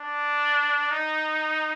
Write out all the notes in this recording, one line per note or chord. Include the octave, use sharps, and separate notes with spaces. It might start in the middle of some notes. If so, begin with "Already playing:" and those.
Already playing: D4
D#4